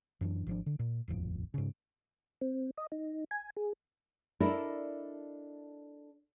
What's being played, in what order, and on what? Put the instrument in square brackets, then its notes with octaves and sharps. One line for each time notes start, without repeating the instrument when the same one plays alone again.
[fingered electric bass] F#2 E3 D4
G#1 F3 D4
D3
A#2
D#1 A1 F2
G#2 C#3
[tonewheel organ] C4
D#5
D#4
G#5
G#4
[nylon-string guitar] D4 E4 A4 A#4 D5 D#5